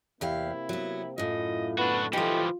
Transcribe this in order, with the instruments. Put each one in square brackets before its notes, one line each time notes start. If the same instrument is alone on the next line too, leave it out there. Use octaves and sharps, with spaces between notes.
[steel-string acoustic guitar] E2 G4 F5 [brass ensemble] C3 A#3 C4 [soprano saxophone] E4
[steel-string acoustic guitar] F#3 B3
[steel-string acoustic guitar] F#2 A2 [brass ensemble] E4 F4 [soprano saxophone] D#5
[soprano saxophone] B3 [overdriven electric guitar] D4 F#4
[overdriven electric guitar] E3 F3 [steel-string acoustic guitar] A3 D#4 [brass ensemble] F4 [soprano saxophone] G4